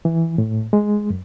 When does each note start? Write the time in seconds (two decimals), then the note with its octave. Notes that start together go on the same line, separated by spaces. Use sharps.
0.05 E3
0.38 A2
0.73 G#3
1.10 F#2